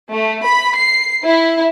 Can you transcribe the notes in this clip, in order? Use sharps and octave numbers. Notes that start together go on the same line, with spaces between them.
A3
B5
C7
E4